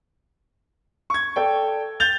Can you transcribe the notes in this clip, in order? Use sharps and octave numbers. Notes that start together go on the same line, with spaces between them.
C#6 G#6
A4 D5 G5
G6 A6 F7 G7